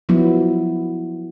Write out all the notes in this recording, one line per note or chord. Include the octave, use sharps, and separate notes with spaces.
F3 F#3 B3 E4